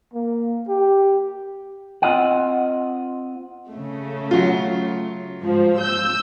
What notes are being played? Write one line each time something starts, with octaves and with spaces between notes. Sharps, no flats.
A#3
G4
C4 F4 D#5 F#5
C#3 A3
F#3 F4
G#2 F3
E6 G6